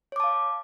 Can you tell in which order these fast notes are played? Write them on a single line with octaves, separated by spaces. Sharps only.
C#5 D6 A5 F5